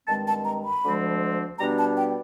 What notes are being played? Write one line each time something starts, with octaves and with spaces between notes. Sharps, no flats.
G2 D#3 G#3 C4 A5
A5
A#5
B5
D2 D3 F3 G#3 C4
B2 G3 B3 D4 A#5
A5
G5